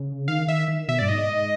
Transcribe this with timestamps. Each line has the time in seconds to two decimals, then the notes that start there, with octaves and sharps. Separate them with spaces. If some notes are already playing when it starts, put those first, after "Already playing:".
Already playing: C#3
0.28 D#3 F5
0.48 D#3 E5
0.68 D#3
0.88 B2 E5
0.99 G2 D5
1.09 G#2 D#5